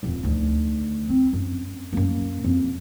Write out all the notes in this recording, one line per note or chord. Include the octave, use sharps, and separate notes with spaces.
D#1 F2
D2 D#3
C4
F#2
F#2 A#3
F2